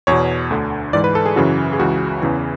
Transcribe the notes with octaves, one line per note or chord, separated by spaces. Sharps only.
E2 B2 C#5
D2 D3
G#2 E3 D5
B4
A4
G#4
F#2 C#3 E3 F#4
G#4
C#2 C#3 E3 F#4
E2 C#3 E3